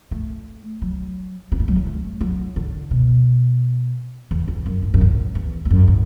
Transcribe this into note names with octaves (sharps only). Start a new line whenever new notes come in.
A3
F#3
B3
A3
F#3
A3
A3
F#3
D3
B2
E2
E2
F#2
A2
F#2
A2
E2
E2
F#2
A2